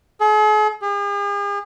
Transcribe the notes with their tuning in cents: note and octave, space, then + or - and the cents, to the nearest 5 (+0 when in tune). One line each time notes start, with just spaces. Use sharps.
G#4 +45
G#4 -45